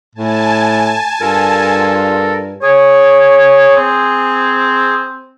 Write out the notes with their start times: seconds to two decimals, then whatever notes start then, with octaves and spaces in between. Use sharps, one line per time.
0.15 A2 G#5 A5
1.21 G2 F4 A4 A#4
2.62 G#4 C#5
3.76 C4